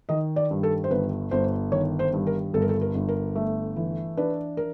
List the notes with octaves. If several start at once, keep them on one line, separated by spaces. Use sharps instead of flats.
D#3 D#5
D5
G2
A4
C5
G1 B4
G1 C5
D#3 C#5
C5
G2
A#4
G1 A4
A#4
A4
A#4
G1
A#4
A3
E3
D4 B4
A#4